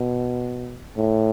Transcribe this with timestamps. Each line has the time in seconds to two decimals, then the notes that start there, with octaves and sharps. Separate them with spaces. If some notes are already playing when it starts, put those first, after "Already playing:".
Already playing: B2
0.97 A2